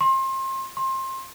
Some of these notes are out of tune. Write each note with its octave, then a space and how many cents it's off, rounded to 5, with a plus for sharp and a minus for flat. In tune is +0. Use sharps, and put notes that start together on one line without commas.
C6 +30
C6 +25